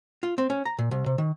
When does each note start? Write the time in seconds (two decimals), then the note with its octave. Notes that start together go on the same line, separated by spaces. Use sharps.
0.23 F4
0.38 C4
0.50 C#4
0.65 A#5
0.78 A#2
0.91 C2
1.06 C3
1.18 D#3